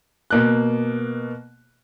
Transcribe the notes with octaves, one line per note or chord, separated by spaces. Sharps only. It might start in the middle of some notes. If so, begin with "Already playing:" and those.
B2 A#3 F#6